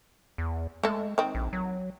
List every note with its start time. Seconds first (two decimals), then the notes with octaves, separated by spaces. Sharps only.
0.38 E2
0.83 G#3 A3 A4
1.18 D#3 C4
1.35 A#1
1.53 F#3